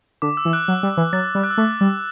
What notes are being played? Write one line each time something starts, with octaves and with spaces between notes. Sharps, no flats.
D3 D6
E6
E3
F#6
F#3
G3
E3
F#3 A6
G3
F#6
E6
A3 D6
G3